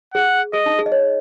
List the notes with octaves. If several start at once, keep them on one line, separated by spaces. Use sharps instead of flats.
G#4 F#5
G#4 D#5
D#4
G#4
D#5
C#5